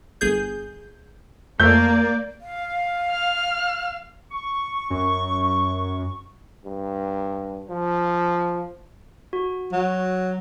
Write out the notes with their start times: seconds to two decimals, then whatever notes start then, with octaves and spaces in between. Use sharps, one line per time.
0.21 G1 G#4 G6
1.60 F2 A3 A#3 D5 G6
2.41 F5
3.10 F6
4.31 C#6
4.90 F#2
6.65 G2
7.70 F3
9.33 F#4
9.72 F#3